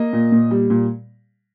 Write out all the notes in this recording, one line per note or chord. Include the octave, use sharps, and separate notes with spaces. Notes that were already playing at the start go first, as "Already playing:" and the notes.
Already playing: A#3 D#5
A#2
A#2
G3
A#2